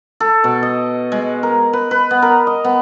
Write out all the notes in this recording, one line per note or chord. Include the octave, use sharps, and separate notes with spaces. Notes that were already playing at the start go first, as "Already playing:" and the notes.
A4
B2
D#5
G#3
A#4
B4
B4
B3
A#4
D#5
B3